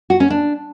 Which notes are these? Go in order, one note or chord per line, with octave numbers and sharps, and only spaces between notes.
F#4
C#4
D4